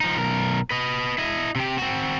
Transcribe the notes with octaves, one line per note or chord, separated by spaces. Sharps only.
F3 D#4
B1 A#4
B4 D#5
E4 D#5
C3 G4
C4 F#4